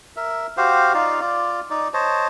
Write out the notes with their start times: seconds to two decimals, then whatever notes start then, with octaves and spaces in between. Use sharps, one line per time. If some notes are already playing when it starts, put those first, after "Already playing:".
0.16 A#4 E5
0.57 F#4 G4 C5 F5
0.94 D#4 F4 D5 F5
1.21 F4 D5
1.71 D#4 D5
1.94 C5 C#5 D#5 A5